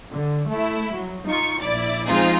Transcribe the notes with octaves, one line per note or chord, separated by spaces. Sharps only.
D3
A3 E4
F#3
D#4 F4 C#6
A#1 E4 D5
F3 G#3 C4 D#4 F4 G#4